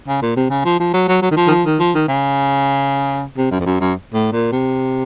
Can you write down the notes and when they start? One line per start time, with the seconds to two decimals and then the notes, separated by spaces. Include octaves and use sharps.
0.08 C#3
0.22 A#2
0.36 C3
0.50 C#3
0.65 F3
0.80 F3
0.93 F#3
1.08 F#3
1.22 F#3
1.31 D#3
1.36 F3
1.47 D#3
1.50 F3
1.65 D#3
1.80 F3
1.94 D#3
2.08 C#3
3.37 C3
3.51 F#2
3.60 F2
3.66 F#2
3.80 F#2
4.13 A2
4.33 A#2
4.52 C3